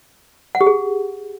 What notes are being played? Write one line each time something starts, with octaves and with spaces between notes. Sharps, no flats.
F#5
G4
G#4